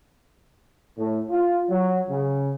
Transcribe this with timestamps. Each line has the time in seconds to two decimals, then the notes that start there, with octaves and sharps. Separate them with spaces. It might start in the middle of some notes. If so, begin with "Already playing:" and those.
0.98 A2
1.30 F4
1.69 F#3
2.10 C#3